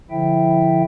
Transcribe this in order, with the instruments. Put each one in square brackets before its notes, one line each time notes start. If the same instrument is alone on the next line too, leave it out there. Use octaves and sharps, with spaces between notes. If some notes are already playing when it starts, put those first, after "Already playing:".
[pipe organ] D3 F3 E4 E5 G5